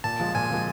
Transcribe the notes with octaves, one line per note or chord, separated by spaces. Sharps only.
A#2 A5
F3 G#3
A#2 G#5
F3 G#3